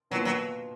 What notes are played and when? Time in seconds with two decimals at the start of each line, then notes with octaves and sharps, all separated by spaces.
0.10 B2 F#3 A#3 F4
0.25 F#3